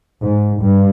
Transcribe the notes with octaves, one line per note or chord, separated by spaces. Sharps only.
G#2
G2